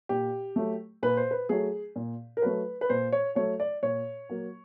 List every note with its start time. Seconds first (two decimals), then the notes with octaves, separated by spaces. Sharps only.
0.09 A#2 G4
0.56 F#3 A3
1.03 A#2 B4
1.17 C5
1.31 B4
1.49 F#3 A3 G#4
1.96 A#2
2.37 A#4
2.42 F#3 A3 B4
2.81 B4
2.89 A#2 C5
3.12 C#5
3.35 F#3 A3 C#5
3.60 D5
3.83 A#2 C#5
4.29 F#3 A#3